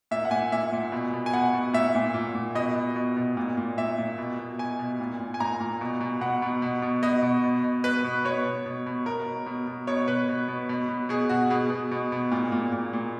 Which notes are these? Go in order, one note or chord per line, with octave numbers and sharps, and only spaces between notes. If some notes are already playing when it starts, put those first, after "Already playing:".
A#2 E5
F#5
A#2 G#5
A#2 E5
A#2
B2
B2
G#5
B2 F#5
B2
A#2 E5
A#2
A#2
A#2
B2 D#5
B2
B2
B2
A#2
A#2
A#2 E5
A#2
B2
B2
B2 G#5
B2
A#2
A#2
G#5
A#2 A#5
A#2
B2
B2
B2 F#5
B2
B2
B2
B2 D#5
B2
B2
B2
B2 B4
B2
B2 C#5
B2
B2
B2
B2 A#4
B2
B2
B2
B2 C#5
B2 B4
B2
B2
B2
B2
B2 G#4
B2 F#4
B2 G#4
B2
B2
B2
A#2
A#2
A#2
A#2